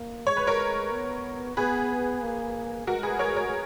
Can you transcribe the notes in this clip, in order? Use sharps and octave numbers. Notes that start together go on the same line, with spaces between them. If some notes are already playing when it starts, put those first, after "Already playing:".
Already playing: A#3
G#3 C#5
B4
A#4 C#5
B3
B3 G#4 B4
A#3
G#3 F#4 A#4
G#4 B4
A#4 C#5
A#4 C#5